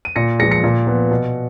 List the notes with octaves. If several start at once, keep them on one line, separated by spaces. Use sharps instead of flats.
D#7
A#2 A#6 C#7
F3 G#3 A#6 C#7
A#6 C#7
A#2
F3 B3
B2